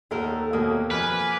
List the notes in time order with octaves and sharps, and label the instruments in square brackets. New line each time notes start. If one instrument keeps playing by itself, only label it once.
[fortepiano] D#2 F#5 E6 [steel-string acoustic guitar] D#4 A4 A#4
[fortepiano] D#2 B2 D#6 [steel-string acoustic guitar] A#3 [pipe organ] A#4
[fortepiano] F2 [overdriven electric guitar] B4 [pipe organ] G#5 D6 F6